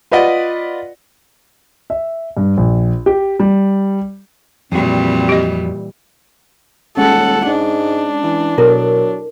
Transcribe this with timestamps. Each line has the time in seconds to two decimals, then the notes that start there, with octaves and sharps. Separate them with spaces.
0.12 F4 B4 D5 D#5 F#5
1.90 E5
2.37 G2
2.57 A#1
3.06 G4
3.40 G3
4.72 F2 A#2 E3 G3 C4 F#4
5.29 G4 D#5
6.97 D#1 G#3 C#4 A4 F#5
7.47 G#2 D4
8.23 E3
8.58 B2 F#3 E4 A4 A#4